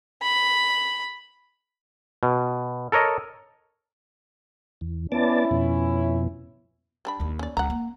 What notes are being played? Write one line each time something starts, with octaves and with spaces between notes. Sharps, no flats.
B5
B2
A4 A#4 C#5 D#5
E2
B3 C#4 E4 D5 A5
F2 B2
G3 D4 B5
D#2 A#3
C#4 D5
C#2 F#5 A#5
A#3